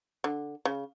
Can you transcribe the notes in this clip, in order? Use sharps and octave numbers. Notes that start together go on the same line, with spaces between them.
D3
C#3